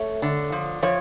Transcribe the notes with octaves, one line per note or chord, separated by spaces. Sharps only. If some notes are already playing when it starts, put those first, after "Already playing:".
Already playing: A3 C#5
D3
F3
F3 C#5